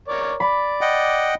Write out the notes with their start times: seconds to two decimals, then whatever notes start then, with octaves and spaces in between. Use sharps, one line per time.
0.08 A#4 C#5 D5
0.40 D5 B5
0.81 D#5 F#5 G5